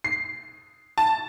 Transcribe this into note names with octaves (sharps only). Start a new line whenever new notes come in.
C7
A5